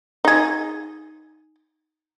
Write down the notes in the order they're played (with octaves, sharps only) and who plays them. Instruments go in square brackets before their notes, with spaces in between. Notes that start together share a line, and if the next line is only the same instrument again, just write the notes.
[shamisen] D#4 G#4